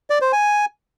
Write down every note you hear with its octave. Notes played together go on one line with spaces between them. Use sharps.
D5
C5
G#5